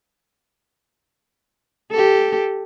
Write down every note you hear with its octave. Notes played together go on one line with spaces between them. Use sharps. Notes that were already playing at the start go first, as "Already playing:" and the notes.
G4 A4